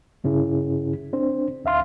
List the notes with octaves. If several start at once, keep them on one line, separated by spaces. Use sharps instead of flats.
G2 C#3 C#4 E4 G#4
C4 D4 C5
D2 E5 F5 C6 F6